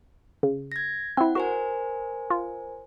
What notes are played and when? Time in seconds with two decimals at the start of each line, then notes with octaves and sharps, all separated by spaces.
0.43 C#3
0.72 G#6 A#6
1.17 C4 E4 F#5
1.35 F#4 A#4 C5 G#5
2.30 F4